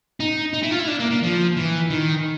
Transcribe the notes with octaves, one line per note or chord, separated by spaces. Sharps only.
D#4
D#4
E4
F4
E4
D4
A#3
A#3
F3
E3
D#3